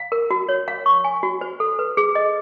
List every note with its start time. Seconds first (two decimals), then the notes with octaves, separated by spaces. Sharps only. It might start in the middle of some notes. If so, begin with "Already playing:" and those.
Already playing: F5
0.12 A#4
0.31 F#4
0.49 C#5
0.68 F5
0.86 C#6
1.04 G#5
1.23 F#4
1.41 C5
1.60 A4
1.79 B4
1.97 G#4
2.15 D#5